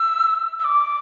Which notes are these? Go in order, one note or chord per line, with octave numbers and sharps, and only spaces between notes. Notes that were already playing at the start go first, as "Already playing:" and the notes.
Already playing: E6
E6
D6